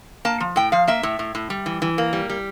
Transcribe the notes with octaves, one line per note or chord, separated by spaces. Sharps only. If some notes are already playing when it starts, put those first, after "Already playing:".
A#3 A5
F3
A2 G5
F3 F5
A#3 E5
A2
A2
A2
G3
E3
E3
A#3
G3
G3